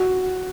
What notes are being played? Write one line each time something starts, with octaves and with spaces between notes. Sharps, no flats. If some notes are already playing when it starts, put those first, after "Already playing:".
Already playing: F#4